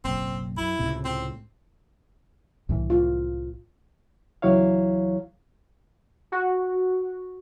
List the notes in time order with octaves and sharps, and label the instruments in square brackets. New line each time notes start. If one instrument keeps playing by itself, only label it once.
[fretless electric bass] F#1 B1 [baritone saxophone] C4
[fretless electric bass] F#2 [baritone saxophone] E4
[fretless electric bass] C#2 A2 C3
[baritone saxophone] C4
[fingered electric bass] C2 A2 E3
[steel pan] F4
[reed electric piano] C#2 E3 F#3 E4 C#5 F5
[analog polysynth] F#4